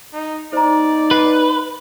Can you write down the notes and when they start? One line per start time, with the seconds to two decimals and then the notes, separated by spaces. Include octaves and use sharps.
0.13 D#4
0.53 D#4 C5 D5 A#5
1.11 B4 F#5